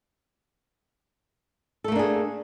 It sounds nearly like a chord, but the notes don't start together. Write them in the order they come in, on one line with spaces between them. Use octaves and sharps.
A4 A3 A#3 D4 G#4